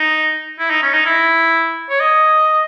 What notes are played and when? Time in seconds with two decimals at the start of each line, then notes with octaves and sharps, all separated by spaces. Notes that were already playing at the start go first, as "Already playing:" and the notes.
Already playing: D#4
0.59 E4
0.70 D#4
0.83 C#4
0.93 D#4
1.06 E4
1.89 C#5
2.00 D#5